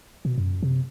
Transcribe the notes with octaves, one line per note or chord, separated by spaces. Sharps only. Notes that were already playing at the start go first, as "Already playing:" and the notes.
B2
F#2
C3